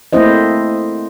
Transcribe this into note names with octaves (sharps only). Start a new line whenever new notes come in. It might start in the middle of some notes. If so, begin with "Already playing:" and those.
A3 A#3 C4 E4 C5 D#5